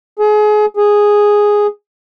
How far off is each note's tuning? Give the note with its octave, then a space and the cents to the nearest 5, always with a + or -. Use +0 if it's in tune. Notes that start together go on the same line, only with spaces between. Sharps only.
G#4 +30
G#4 -5